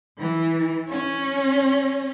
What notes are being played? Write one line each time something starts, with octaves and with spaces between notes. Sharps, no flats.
E3
C#4